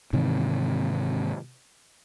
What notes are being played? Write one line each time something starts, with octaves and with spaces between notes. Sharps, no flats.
G#2 C3 D#3 E3